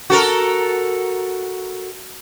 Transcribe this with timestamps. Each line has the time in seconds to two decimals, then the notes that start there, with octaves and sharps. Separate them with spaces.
0.10 F#4 A4 A#4